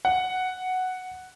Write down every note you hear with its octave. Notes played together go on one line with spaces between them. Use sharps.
F#5